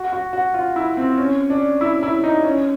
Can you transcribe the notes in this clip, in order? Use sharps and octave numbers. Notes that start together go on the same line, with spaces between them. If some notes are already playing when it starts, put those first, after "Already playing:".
Already playing: F#4
F#4
F#4
F4
E4
C4
C#4
D4
E4
E4
D#4
C#4